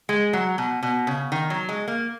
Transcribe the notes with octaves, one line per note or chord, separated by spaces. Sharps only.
G#3
F#3
B2
B2
C#3
D#3
F#3
G#3
A#3